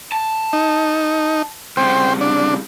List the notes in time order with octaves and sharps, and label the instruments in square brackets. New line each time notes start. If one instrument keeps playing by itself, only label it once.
[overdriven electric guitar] A5
[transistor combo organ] D#4
[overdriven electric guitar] C2 C#3 [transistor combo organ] C5 G5
[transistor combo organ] D4